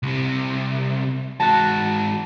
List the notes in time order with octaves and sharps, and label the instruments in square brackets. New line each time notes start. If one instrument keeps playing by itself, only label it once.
[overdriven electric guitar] C2 C3
[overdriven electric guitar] G#2 F#4 [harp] A5 F#6